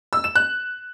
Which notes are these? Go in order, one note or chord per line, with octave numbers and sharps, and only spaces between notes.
E6
E7
F#6